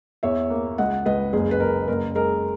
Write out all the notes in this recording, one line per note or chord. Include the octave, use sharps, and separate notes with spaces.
E2 C#5 E5
A#3
C#2 D#5 F#5
C#2 B4 D#5
F#1 G#4
B4
F#1 A#4
F#1 A#4
G#3 A#4